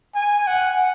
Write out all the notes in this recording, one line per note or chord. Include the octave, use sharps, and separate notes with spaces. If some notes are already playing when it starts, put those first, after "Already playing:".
G#5
F#5